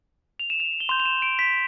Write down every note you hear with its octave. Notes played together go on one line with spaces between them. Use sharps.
F7
E7
F7
G7
C6 G6 F7
F7
E7
D7
B6